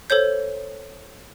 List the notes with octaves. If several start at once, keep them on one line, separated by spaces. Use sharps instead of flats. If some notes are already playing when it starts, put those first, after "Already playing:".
A4 C5 C#5 G6